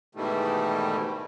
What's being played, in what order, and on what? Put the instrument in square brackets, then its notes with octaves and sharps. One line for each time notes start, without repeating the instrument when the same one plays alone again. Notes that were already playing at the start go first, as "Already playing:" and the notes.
[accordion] G#2 B2 D#3 E3 G3 A3